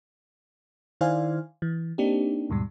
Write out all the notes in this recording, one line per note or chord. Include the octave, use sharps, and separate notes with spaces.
D#3 E4 C5 D5 F5 G#5
E3
A#3 C4 D4 D#4 G4
D#2 G#2 B2 G3